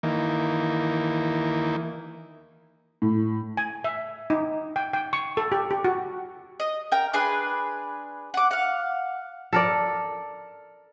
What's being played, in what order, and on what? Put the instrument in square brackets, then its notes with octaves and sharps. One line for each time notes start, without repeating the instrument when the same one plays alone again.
[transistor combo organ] D#3 E3 A#3
[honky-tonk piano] A2
[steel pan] G#5
E5
D#4
G5
G5
C#6
A4
G4
G4
F#4
[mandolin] D#5
A#4 G5
D4 G#4 B4 C6
F#5 D6
F5 F#5
[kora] A4 A#4 D5